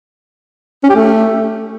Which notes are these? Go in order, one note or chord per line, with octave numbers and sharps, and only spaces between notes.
C#4
G4
A3